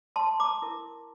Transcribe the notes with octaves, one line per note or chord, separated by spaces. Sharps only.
A5 C6
A#5 D6
E4 A#4